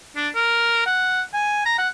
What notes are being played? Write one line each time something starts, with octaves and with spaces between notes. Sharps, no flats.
D4
A#4
F#5
G#5
A#5
F#5